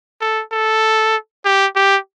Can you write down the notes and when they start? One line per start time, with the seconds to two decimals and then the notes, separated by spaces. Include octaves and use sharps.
0.21 A4
0.52 A4
1.45 G4
1.76 G4